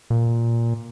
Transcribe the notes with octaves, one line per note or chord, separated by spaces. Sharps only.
A#2